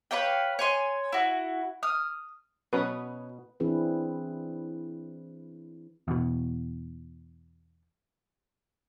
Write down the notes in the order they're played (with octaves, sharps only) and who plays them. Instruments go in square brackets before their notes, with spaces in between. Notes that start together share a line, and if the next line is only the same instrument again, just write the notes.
[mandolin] B4 C#5 F5 G5
C#5 G#5 C6
E4 F#4
D#6 F6
[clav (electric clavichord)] B2 [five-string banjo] F#3 C#4 [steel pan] B4 D#6
[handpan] E3 C4 D4 E4 G#4 B4
[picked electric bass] E2 B2